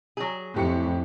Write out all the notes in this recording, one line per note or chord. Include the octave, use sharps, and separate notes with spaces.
F#3 G#4
F2 A2 G4 C#7